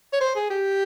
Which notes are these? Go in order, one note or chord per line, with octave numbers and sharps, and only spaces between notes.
C#5
C5
G#4
G4